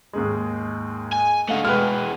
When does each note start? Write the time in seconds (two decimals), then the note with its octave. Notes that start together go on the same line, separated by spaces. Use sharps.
0.13 D#2 G#2 G#3
1.13 G#5
1.49 D3 A3 D#4 F5 F#5
1.65 B2 G#3 B4 G5 F6